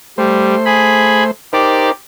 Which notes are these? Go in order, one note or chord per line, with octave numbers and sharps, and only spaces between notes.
G3 A3 C5
G#4 B5
D#4 G4 A#4 C5 D5